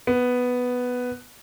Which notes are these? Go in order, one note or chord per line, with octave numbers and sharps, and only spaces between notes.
B3